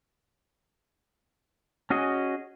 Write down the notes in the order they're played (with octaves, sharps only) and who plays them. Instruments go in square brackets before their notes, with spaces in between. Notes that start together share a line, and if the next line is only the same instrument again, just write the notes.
[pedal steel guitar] C#4 F#4 G#4 D#5